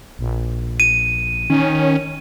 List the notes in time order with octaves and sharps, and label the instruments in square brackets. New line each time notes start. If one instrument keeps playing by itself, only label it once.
[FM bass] A#1
[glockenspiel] D#7
[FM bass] D#3 [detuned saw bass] C#4